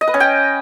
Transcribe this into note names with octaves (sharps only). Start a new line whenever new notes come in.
D#5
B4
C#4
G5